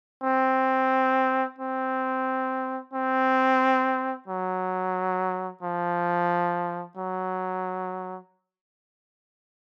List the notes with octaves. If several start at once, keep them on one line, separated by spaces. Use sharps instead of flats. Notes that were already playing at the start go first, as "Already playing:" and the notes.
C4
C4
C4
F#3
F3
F#3